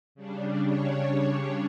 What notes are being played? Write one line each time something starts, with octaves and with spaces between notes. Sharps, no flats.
C#3 G3 D4
C#5